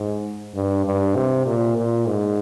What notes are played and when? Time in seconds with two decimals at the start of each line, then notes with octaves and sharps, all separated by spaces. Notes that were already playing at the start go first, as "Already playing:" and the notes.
Already playing: G#2
0.55 G2
0.85 G2
1.16 C3
1.46 A#2
1.77 A#2
2.07 G#2